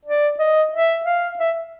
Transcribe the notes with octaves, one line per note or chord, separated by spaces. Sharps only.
D5
D#5
E5
F5
E5